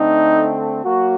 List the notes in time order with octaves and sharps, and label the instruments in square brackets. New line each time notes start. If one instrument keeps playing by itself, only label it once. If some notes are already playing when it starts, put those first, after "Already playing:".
Already playing: [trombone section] D3 A3 C4 D#4
F#3 A#3 F#4